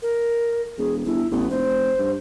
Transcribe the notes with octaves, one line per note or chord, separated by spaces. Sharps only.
A#4
E1 G#4
G1 E4
A1 B3
F1 C5
G2